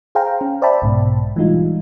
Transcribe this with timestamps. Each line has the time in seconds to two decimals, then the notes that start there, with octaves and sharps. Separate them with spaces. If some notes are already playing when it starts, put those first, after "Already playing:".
0.15 G#4 C5 F5 G5 A#5
0.41 C#4
0.62 C5 D5 E5 G5 A5 B5
0.82 B1 G#2 B2
1.36 E3 G3 G#3 D#4 F4